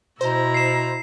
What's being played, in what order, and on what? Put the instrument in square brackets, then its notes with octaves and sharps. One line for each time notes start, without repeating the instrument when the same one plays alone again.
[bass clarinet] B2 [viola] E4 A#5 [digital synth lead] C5
[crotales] C7 E7